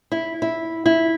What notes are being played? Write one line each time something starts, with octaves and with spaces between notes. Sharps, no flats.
E4
E4
E4